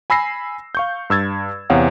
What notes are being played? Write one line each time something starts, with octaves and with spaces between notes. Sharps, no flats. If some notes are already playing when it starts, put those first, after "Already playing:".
G#5 B5 E6 A#6 C7
F5 C#6 G6
G2 E6 G#6 A6
E2 C3 C#5 F5 F#5 D#6